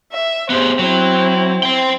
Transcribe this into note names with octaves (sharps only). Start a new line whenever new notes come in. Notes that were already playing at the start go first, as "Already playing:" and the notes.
E5
B3 G4 G#4 C5
F#3 C4 E4
C5 G5